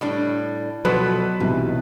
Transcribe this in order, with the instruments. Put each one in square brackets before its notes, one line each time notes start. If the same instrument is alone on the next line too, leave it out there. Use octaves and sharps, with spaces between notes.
[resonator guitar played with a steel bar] A2 G3 D4
[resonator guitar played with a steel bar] B2 F3 A4 [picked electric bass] F#3 [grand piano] B4
[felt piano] B1 C3 E3 [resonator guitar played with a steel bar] G2